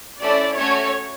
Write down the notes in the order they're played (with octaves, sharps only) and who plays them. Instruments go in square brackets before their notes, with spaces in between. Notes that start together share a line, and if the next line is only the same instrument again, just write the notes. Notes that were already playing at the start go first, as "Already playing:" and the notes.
[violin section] A3 C#4 E4 [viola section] D5
[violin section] A3 C#4 F#4 [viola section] C#5